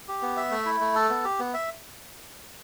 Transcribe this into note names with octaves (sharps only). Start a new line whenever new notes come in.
G4
B3
E5
A3
E4
A3
A4
B3
G4
B3
E5